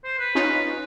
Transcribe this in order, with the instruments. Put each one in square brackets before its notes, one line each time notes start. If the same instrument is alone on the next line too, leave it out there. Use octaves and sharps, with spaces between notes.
[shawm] C5
B4
[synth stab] C#4 D#4 F4